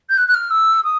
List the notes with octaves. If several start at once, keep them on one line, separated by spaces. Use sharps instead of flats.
G6
F#6
F#6
F6
E6
D#6